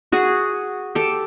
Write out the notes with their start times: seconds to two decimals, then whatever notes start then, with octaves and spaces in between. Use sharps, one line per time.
0.12 F#4 G#4
0.95 G4 A4